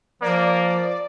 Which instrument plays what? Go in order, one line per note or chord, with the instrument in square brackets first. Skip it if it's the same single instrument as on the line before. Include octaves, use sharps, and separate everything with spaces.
[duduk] F3 [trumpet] A#3 [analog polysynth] D5